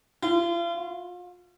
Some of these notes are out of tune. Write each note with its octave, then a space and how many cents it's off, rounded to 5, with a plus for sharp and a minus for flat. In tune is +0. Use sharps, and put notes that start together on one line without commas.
F4 -40
F4 +35